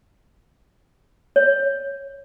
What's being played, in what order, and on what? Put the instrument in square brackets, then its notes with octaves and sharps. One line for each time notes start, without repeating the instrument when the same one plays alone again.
[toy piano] C#5